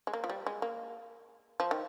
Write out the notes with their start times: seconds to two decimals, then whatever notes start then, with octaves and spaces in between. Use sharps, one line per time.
0.07 G#3
0.13 A#3
0.24 F3
0.30 G3
0.46 G#3
0.62 A#3
1.60 F3
1.71 D#3